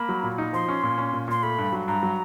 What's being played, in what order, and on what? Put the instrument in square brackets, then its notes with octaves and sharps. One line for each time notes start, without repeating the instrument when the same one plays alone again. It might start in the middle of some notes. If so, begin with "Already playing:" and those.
Already playing: [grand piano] A#3 [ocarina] B5
[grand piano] F#3
A#2
D#4
[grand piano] F3 [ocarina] C6
[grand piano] C#4
A#2
C#4
A#2
[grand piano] A#2 [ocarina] C6
[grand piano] A3 [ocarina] B5
[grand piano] G2
F#3
[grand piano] G2 [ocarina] A#5
[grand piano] F#3